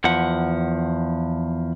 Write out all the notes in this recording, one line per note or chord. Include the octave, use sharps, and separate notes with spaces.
E2 F3 F#5